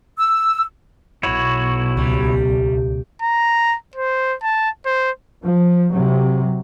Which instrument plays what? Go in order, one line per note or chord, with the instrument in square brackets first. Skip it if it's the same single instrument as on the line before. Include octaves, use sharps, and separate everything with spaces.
[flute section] E6
[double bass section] B1 [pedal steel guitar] E4 F#4 C#5
[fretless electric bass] C#2 [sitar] G3
[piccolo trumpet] A#5
C5
A5
C5
[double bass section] F3
C3 F#3